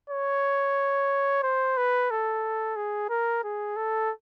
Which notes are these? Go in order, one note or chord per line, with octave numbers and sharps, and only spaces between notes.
C#5
C5
B4
A4
G#4
A#4
G#4
A4